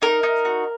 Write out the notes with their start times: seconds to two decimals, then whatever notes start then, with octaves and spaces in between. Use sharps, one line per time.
0.02 D#4 A#4
0.23 D#4
0.45 F#4